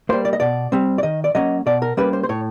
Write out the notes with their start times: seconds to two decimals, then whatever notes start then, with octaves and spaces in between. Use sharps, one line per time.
0.09 G3 A#3 C5
0.25 D5
0.33 D#5
0.40 B2 D5
0.72 G3 C4
0.98 D5
1.03 D#3 D#5
1.24 D5
1.35 F#3 A#3 C#4 D#5
1.66 B2 D5
1.82 A#4
1.97 G3 A#3 C#4 B4
2.13 C5
2.23 C5
2.29 A2 C#5